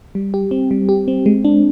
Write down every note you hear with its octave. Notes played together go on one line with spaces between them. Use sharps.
G3
G4
C4
G3
G4
C4
G#3
D4